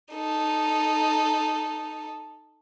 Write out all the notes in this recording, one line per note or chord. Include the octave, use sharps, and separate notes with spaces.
D#4 A4